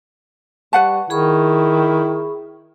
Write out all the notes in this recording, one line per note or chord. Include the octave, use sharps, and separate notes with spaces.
G3 B4 F#5 A5 C#6
D#3 E4 G#4 B5 C#6